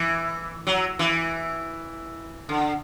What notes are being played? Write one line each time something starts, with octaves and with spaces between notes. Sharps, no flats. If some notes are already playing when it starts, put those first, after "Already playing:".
Already playing: E3
F#3
E3
D3